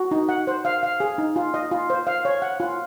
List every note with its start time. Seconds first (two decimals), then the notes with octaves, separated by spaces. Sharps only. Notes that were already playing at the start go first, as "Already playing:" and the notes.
Already playing: F#4
0.11 D#4
0.29 F#5
0.47 C5
0.65 F5
0.83 F5
1.00 G#4
1.18 D#4
1.36 F4
1.54 D#5
1.71 F4
1.90 C5
2.07 F5
2.25 C#5
2.42 F#5
2.60 F4